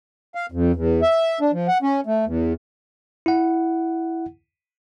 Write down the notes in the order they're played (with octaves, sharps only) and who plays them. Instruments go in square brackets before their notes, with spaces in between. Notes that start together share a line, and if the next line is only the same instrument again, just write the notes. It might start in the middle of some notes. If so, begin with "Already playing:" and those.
[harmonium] F5
F2
E2
E5
D4
F3
F#5
C#4
A3
E2
[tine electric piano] E4 F#5